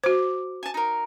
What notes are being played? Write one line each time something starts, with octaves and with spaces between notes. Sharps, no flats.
F#4 C5 D6
G#5 A5
D#4 A#4